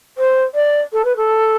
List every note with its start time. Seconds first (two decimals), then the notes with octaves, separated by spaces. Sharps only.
0.18 C5
0.54 D5
0.93 A4
1.05 B4
1.16 A4